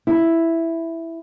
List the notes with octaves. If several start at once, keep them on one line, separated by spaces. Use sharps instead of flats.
E4